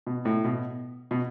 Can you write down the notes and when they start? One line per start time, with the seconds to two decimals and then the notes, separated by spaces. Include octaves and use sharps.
0.07 B2
0.25 A2
0.44 B2
1.11 B2